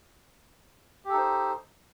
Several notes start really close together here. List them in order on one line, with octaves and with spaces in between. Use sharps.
G4 A4 D#4 C5